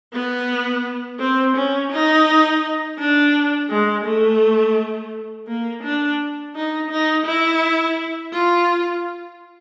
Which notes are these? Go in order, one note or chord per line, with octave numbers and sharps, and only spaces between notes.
B3
C4
C#4
D#4
D4
G#3
A3
A#3
D4
D#4
D#4
E4
F4